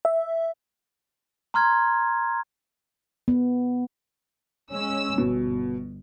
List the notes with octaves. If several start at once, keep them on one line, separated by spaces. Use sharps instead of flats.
E5
A#5 C6 F6 G#6
B3
G#3 C#4 E6
G1 B2